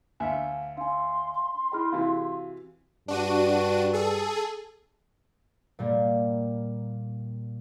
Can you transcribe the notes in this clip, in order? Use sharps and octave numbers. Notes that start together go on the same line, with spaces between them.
D2 E5 F5 G#5 F6
D4 F5 G#5 C6
E4 G#4 D#5 G5 B5 F6
C3 E3 F#4 F5
G2 D4 F#4 D#7
G#4 A4
A#2 G3 A#3